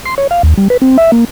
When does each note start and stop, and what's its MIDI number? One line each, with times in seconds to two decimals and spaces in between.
0.06 0.15 84
0.18 0.27 73
0.31 0.42 77
0.43 0.54 39
0.58 0.68 55
0.70 0.77 71
0.82 0.97 60
0.98 1.11 76
1.12 1.25 58